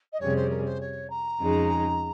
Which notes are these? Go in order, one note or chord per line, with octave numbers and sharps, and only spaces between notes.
D#5
F2 C3 G3 C#4 G#4 C#5
C5
A#4
C5
C#5
A#5
F2 C#3 G#3 D#4